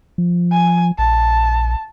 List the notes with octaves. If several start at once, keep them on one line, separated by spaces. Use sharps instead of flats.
F3
G#5
A#1 A5